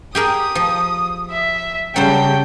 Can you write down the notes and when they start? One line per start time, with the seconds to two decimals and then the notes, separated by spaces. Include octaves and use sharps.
0.15 G4 G#4 A#4 D#6
0.55 F3
1.31 E5
1.96 C#3 F#3 G3 A4 C5 G5